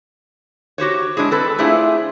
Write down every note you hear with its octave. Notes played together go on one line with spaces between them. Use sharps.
F#4 G4 C5 C#5
G#3 D4 E4 G#4
C4 A4 B4
A3 D4 E4 F4 G#4 C5